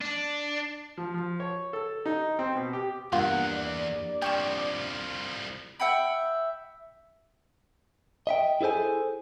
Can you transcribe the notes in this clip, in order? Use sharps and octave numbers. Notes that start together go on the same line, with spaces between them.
D4
F3
F3
C#5
A4
D#4
C4
B2
G4
E2 G2 A#3 F4 F#5 G6
D5
C2 F3 G5 C#6 E7
E5 F#5 G5 B5
D#5 E5 G5
E4 G#4 A4 C5 G#5